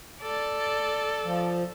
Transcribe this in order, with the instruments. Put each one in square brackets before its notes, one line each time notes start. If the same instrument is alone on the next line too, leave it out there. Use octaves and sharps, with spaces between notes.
[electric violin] A4 [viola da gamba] D5
[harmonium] F3